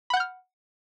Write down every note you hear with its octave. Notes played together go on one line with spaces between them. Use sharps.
F#5 B5 F6 G6